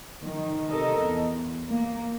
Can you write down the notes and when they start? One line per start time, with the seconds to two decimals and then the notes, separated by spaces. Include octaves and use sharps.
0.23 D#3
0.68 C3 A4 A#4 D#5
1.02 E2
1.66 A#3